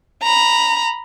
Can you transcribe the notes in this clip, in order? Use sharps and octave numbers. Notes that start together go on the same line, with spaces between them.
A#5 B5